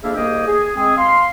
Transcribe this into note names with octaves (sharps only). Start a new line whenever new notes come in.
F2 A#3 D4 G#4 E5 F5
C2 A#3 G#4 D#5 G5 D#6
G#4
G#3 C4 G#4
F5 C6